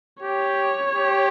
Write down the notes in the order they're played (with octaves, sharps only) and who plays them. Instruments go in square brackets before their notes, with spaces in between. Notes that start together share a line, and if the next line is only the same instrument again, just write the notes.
[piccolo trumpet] G4 [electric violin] C#5
[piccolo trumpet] G4